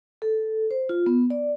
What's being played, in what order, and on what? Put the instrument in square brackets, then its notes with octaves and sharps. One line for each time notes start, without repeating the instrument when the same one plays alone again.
[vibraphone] A4
C5
F4
B3
D5